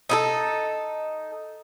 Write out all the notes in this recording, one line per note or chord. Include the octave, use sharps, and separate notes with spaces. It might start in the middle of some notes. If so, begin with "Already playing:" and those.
D#4 E4 A4